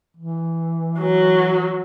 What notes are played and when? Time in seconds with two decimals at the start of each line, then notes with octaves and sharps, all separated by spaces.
0.17 E3
0.99 F#3